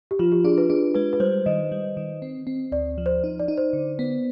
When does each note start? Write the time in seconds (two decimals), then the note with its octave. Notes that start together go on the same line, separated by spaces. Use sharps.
0.11 G4
0.19 F3 F4
0.32 G4
0.44 D4 G#4
0.58 B4
0.69 D4 G#4
0.94 G#3 B4
1.13 B4
1.20 G3 C5
1.46 D#3 D#5
1.72 G3
1.97 D#3
2.22 C4
2.47 C4
2.72 D2 D5
2.98 F3
3.06 C5
3.24 D#4
3.39 D5
3.48 D#4
3.57 C5
3.73 D3
3.99 B3